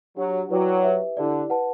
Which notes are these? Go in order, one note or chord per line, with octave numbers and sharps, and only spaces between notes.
F#3 D4 G4 C#5 F#5
F#3 E4 B4 D5 G5 D6
G4 B4 E5
D3 E4 G4 D5
B4 F#5 A5